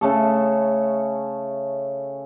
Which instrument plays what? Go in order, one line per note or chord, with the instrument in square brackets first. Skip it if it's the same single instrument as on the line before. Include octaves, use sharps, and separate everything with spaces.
[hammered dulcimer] C#3 A3 A4